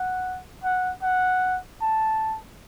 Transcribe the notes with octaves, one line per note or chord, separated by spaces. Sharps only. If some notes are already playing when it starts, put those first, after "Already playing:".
Already playing: F#5
F#5
F#5
A5